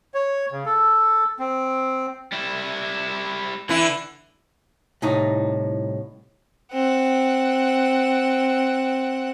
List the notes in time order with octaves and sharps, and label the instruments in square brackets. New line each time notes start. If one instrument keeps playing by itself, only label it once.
[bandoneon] C#5
C#3
A4
C4
[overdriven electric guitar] G3 E4
[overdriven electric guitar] D3 [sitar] E3 E4
[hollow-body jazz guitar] C2 A2 D#4
[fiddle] C4 F#5